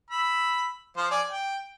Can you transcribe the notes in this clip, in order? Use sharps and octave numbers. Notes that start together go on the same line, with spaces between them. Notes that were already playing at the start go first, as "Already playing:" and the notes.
B5 E6
F3 C5 F5
D5 G#5
G5